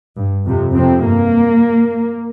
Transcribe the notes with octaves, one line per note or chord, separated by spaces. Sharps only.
G2
F2 C3
F2 C3 C4
G2 A#3